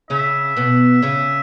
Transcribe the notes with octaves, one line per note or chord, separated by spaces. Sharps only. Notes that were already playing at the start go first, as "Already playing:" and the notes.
C#3 C#4 E5
B2 B3
C#3 C#4